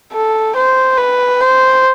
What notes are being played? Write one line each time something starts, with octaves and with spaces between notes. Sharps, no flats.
A4
C5
B4
C5